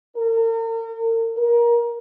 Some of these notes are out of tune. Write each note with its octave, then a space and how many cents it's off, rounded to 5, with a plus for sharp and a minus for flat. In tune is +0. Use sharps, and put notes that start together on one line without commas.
A#4 -40
A#4 +20